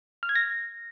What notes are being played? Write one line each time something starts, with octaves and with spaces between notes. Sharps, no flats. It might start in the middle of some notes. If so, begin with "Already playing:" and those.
F6
G#6
A#6